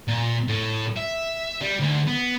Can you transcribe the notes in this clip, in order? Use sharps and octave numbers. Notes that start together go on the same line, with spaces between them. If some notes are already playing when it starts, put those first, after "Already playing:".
A#2
A2
E5
G3
D2
B3